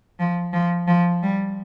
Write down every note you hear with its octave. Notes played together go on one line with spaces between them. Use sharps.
F3
F3
F3
G3